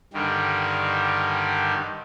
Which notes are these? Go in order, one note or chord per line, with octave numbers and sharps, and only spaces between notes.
G2 D3 D#3 G3